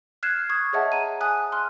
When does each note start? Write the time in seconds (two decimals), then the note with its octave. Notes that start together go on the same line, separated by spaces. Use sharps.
0.23 F6 F#6 G#6 C7 E7
0.49 C#6 D#6 G#6
0.73 G#4 C#5 D#5 E5 F#5 A5
0.92 A#5 D#7
1.21 G#5 D#6 F#6
1.52 C6 F6 F#6